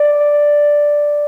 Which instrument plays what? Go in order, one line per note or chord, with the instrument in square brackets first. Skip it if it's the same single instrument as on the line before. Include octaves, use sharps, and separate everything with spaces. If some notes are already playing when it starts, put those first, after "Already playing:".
Already playing: [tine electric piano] D5